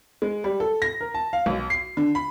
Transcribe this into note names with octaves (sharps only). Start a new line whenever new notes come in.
G#3
G3
A4
A#6
A#4
A5
F5
B1
C7
D3
B5